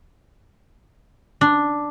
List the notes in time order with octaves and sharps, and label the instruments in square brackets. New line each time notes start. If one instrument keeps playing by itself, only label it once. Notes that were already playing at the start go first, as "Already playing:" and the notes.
[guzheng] D4